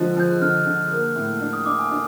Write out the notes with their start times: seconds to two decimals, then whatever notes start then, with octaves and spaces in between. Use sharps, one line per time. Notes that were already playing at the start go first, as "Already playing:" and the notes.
Already playing: D3 F3 G#3 F#6
0.17 F3 G6
0.31 F#6
0.41 D3 F6
0.66 D3
0.91 A#3
1.16 A2
1.41 D4
1.53 D#6
1.66 D4 D6
1.79 G#5
1.91 D4